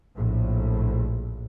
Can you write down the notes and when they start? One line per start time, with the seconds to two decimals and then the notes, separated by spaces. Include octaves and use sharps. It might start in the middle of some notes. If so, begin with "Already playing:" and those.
0.17 A#1 A2